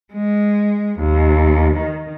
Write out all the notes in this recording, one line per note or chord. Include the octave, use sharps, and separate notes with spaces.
G#3
D#2
D#3